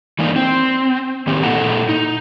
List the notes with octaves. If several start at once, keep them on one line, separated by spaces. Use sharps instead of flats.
E3 A3 A#3 D4 D#4
C4
D#3 A#3 C4 G4
A#2 A3 E4 A4 F#5 A#5
D#4